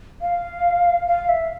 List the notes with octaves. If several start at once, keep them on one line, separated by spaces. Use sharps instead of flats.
F5
F5
E5